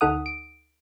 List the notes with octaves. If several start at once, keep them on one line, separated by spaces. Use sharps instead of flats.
D2 D#4 A4 F#5 D#6
D7